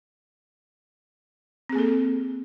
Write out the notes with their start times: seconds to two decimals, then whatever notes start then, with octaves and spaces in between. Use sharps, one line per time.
1.69 C4
1.72 G#4
1.75 A#3
1.78 A4